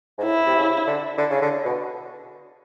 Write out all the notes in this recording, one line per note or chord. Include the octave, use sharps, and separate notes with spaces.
G#2
A2 E4
C3
C#3
D3
D3
C#3
D3
B2